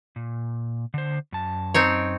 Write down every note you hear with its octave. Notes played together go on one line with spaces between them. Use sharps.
A#2
D3 C5
F#2 A5
C4 D#4 C#5